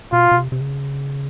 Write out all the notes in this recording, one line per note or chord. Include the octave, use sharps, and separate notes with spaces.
B2 F4
B2
C3
C3
C#3